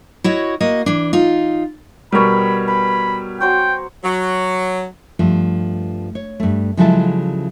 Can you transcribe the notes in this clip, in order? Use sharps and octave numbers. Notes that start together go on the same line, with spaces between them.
E4 F#4 C#5 D#5
A#3 F#4 D#5
E3 D4
D#4 F4
B2 G3 A#4 C#5 B5
B4 B5
F#3 C5 C#5 G5
F#3
G2 F3 A3
C#5
G2 A3
C#3 F3 F#3 G#3 E4 A4